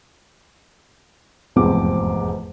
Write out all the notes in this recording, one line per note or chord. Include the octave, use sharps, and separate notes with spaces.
F1 E2 G#2 F3 C4 D6